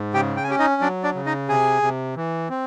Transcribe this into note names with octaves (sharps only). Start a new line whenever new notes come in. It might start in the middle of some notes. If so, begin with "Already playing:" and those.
Already playing: G#2
C#3 G4 G5
G5
G#5
C#4 G4 G5
D#4 D#5
F#3 D4 D5
D4 D5
C#3
D#4 D#5
C3 G#4 G#5
C3
E3
C4